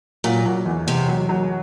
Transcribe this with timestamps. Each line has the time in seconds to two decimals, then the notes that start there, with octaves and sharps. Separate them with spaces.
0.24 A#2 F#3
0.46 F#3
0.66 E2
0.87 E2 C3
1.08 F#3
1.29 F#3